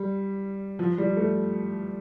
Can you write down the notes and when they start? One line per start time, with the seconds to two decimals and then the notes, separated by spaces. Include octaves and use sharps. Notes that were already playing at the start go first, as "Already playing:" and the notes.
Already playing: G3
0.79 F3
0.98 G3
1.17 A3